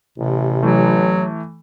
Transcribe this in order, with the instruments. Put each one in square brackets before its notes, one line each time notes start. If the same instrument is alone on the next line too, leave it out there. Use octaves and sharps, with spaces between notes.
[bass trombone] A1 [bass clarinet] C3
[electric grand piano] E3 A3 [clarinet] F#3